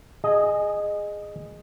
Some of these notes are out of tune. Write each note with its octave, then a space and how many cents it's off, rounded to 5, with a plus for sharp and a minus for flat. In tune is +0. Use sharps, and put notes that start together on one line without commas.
G#4 +0 D#5 -15